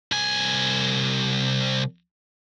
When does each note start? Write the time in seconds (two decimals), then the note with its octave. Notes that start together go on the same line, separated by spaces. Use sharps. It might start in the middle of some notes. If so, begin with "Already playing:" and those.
0.12 C2 G#5